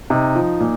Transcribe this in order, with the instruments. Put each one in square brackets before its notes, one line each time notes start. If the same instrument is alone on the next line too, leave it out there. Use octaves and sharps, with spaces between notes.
[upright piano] C3 D#4
F3
A#2